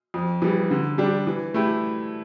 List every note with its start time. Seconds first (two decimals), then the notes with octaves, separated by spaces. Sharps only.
0.14 F2
0.42 E3 G3
0.71 D3
0.98 G3 D4 G4
1.27 E3
1.54 A3 E4 G4